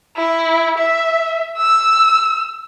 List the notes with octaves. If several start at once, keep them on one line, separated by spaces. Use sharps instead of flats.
E4
E5
E6